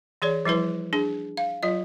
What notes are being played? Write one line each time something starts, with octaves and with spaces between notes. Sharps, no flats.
E3 G#4 C#5 D5
F3 G3 E4 B4
D4 G#4
F5
F#3 F4 D#5